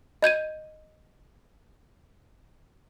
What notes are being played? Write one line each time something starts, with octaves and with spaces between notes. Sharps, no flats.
D#5 G6 G#6 D#7